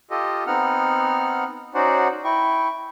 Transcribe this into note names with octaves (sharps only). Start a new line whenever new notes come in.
F4 G4 A4 D#5
B3 C4 D#4 F#5 F6
C#4 D#4 F#4 C5 D5 F#5
E4 G5 C#6